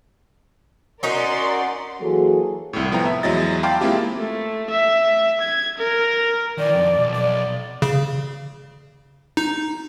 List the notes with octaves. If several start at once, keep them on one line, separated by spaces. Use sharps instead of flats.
C#4 D#4 F#4 A#4 D5 C6
E3 F#3 A#3 F#4 G#4 A4
C2 A2
A2 F3 B3 G5 A#5
E5
E2 F#3 G#3 E4 D#5 A6
F5 G5 A5 B5 C6 D6
G#3 A#3 C4 E4 F4 G4
A3
E5
G#6
A#4
D#3 E3 D5
F2
B1
D5
C#3
D#4